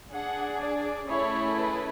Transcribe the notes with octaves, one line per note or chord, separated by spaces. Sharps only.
D4 G#4 F#5
D5
A3 C#4 E4 G#4 C#5
B4